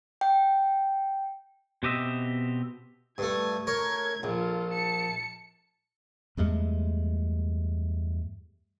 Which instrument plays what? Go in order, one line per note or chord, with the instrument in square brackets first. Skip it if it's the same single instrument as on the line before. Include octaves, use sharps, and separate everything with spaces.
[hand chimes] G5
[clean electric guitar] B2 C4 G4 D#5 E5
[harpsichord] G2 A3 [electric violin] G#6
[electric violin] A3 G#6 [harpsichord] A#4 C#5
[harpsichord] A#1 [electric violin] F4 A4
[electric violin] A5 C#7
[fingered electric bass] E2 G2 G#3 A3